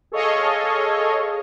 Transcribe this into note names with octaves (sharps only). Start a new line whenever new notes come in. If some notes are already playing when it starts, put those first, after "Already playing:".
G#4 A4 C#5 D#5 F5 C#6